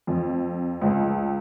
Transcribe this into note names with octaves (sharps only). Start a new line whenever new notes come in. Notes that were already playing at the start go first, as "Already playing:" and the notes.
F2
C#2